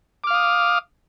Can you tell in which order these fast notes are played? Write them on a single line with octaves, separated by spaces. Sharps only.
D6 F6 F5 D#6